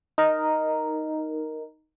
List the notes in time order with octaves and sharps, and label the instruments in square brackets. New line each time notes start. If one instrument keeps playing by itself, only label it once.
[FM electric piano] D#4 A#4